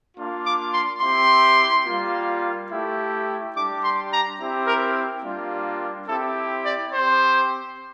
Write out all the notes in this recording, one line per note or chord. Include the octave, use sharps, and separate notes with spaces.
A#3 D4 F4
D6
C6
C4 E4 G4 C6
G3 A#3 F4
A3 E4 G4
G3 D4 G4 D6
C6
A#5
C4 E4 G4
A#4
G3 A#3 D4 F4
C4 E4 G4 A4
D5
C4 G4 C5